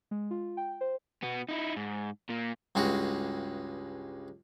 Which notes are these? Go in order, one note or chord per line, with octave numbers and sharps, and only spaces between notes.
G#3
F4
G5
C5
B2 B3
D#4 E4
G#2
A#2 A#3
C#2 G2 G#3 F#4